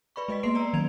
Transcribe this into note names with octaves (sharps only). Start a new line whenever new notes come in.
B4 D5 B5 C#6
G#3 B4 D#5 C#6 B6
A#3 B3 B4 C6 C7 D7
D5 A#5 E6
D#3 F#3 G#6 F7